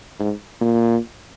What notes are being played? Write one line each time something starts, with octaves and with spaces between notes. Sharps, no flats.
G#2
A#2